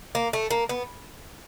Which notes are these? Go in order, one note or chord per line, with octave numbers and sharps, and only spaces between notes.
A#3
A3
A#3
B3